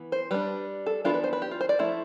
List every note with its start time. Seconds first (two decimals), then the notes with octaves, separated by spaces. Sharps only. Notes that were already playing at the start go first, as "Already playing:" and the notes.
Already playing: E3 B3
0.12 C5
0.31 G3 D4 B4
0.86 A4
1.05 E3 B3 D4 F4
1.14 B4
1.24 C5
1.33 B4
1.42 G4
1.51 F4
1.61 C5
1.69 D5
1.79 F3 A3 E4